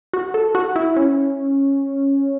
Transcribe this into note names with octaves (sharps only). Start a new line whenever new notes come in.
F#4
A4
F#4
E4
C#4